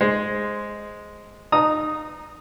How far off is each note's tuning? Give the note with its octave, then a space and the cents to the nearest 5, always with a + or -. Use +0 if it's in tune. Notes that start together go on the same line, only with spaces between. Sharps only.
G#3 +0 C5 +0
D#4 -20 A#5 +0 D#6 +0